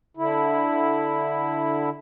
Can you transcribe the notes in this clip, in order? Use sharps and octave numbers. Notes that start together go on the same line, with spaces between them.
D3 E4